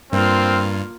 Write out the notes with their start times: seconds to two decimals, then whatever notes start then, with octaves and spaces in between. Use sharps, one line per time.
0.13 G2 A#3 C4 F4